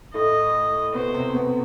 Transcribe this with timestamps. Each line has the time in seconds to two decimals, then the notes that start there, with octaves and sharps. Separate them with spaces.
0.14 A2 A3 D#5
0.94 B2 B3 C5
1.14 C3 C4
1.34 B2 B3